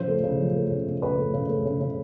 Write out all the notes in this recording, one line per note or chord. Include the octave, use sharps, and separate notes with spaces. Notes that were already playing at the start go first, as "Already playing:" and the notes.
Already playing: C#3 F3 C5
A3
C#3
F3
A3
C#3
C#3
C#3 B4
A3
C#3
A3
C#3
C#3